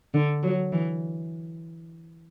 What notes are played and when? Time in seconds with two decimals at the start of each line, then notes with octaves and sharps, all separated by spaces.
0.14 D3
0.43 F#3
0.73 E3